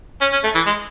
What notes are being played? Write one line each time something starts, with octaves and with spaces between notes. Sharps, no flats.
C#4
C#4
A3
E3
G#3